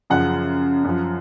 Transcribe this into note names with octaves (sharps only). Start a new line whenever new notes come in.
F#2 C#3 F3 F#5
F#2 F3